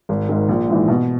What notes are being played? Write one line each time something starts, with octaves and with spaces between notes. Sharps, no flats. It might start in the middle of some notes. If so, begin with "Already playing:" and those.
G#1
G#2 D#3
A#1
G#2 E3
B2